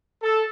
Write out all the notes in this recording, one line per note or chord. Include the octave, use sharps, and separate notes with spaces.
A4